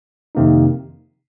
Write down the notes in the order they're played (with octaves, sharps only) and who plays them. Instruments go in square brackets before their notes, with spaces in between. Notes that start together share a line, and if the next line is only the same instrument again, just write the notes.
[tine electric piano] F2 C3 D#3 A#3 D#4